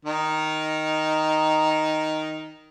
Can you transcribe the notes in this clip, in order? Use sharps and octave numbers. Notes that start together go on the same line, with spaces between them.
D#3 D#4